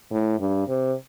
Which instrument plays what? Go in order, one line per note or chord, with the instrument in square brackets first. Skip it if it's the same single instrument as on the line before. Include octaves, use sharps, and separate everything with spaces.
[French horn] A2
G2
C3